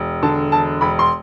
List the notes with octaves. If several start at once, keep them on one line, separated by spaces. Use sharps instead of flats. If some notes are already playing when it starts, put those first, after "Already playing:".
Already playing: E1
D3 A5
E1 A5
E1 B5
C6